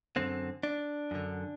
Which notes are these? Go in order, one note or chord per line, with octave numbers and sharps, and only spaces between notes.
F#2 D3 C4
D4
F#2 D3